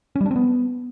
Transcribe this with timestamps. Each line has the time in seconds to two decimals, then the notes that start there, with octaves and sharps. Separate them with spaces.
0.16 C#4
0.21 G3
0.26 D4
0.31 C4
0.36 B3